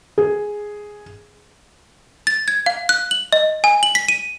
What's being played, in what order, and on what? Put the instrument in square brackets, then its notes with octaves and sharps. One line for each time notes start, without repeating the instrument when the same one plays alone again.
[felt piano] G#4
[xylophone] A6
G#6
F5
F#6
F#7
D#5
G#5
F#7
B6
D#7